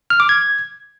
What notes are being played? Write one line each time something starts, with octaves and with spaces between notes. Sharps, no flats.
F6
D6
G#6